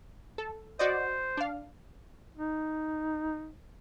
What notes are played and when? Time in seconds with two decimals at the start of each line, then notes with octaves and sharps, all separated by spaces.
0.38 A4
0.79 F#4 C5 D5 D#5
1.37 D4 F5
2.38 D#4